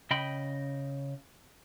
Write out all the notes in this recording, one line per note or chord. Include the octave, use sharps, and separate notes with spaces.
C#3 D#5 G5 B5